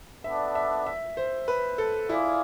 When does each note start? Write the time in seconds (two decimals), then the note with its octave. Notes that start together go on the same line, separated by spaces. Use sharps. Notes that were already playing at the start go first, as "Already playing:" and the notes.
0.24 B3 D4 A4 D5 E5
0.55 E5
0.86 E5
1.17 C5
1.48 B4
1.78 A4
2.09 E4 F4 G#4 D5 F5